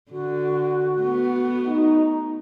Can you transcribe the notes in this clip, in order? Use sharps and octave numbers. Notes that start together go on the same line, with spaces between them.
D3 F#4
A3 B3
D#4